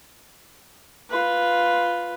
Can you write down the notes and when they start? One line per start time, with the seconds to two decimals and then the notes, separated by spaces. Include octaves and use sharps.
1.10 F4 B4